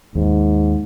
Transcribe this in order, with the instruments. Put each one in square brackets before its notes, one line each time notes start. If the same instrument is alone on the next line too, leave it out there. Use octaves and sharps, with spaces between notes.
[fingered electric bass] D#2 [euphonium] G#2